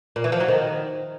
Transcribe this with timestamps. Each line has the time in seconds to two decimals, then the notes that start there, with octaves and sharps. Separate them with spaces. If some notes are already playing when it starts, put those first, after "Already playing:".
0.16 A#2
0.24 E3
0.32 F3
0.40 F#3
0.48 D#3